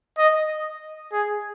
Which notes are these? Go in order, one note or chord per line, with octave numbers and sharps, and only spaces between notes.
D#5
G#4